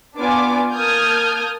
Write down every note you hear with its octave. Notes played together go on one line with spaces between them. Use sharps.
B3 D4 F4 G#5 D6
A#3 A5 D#6 F6 G6 G#6